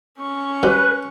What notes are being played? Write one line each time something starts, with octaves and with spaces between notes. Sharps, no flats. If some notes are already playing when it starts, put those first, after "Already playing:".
C#4 C#6
G2 F#3 B4 C5